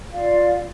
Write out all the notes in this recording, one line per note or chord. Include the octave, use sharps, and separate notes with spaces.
F4 D5 F5